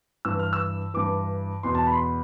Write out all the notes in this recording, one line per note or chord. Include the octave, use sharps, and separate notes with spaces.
G2 E3 E6
F6
E6
G2 E3 D6
E2 B2 C6
A5
B5
C6
B5